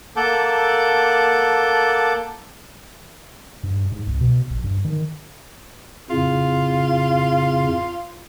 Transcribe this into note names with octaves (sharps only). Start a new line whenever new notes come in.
A#3 A4 F#5 A5 D6 G6
G2
G#2
C2
B2
A#1
G2
D#3
F2 A2 C#3 F4